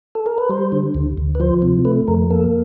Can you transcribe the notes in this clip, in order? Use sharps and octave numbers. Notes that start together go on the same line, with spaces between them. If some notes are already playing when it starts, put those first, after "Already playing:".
A4
A#4
B4
G3 C5
D3
D2
D2
B4
F3 C5
C3
A3 B4
F2 A#4
A#3 A4